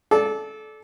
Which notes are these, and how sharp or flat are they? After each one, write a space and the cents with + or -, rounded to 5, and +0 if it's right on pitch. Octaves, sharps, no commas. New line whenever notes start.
A4 -25 D5 +0